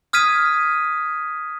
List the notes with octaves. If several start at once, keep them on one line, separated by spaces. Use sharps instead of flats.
D#6 F6 G#6 B6 D#7